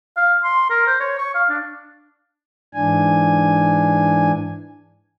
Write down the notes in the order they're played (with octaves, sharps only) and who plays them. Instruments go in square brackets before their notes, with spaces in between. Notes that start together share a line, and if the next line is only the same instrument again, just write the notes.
[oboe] F5
C6
A#4
C5
C#5
C#6
F5
D4
[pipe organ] G#2 E3 D4 G#5